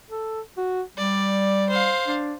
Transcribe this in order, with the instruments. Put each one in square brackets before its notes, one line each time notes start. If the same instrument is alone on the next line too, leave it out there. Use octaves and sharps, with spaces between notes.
[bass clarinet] A4
F#4
[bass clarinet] G3 [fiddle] D5
[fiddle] C5 F5
[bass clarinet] D4